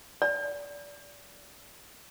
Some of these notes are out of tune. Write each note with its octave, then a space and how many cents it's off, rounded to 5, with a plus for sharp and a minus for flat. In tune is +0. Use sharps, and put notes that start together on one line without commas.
D5 -25